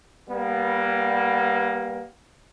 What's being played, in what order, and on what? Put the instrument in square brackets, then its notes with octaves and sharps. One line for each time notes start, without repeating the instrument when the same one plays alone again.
[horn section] G3 A#3 B3